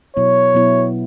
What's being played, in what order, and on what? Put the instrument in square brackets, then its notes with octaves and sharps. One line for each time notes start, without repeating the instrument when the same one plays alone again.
[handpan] B2 F#3 B3 E4 [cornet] C#5
[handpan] B2 F#3 B3 E4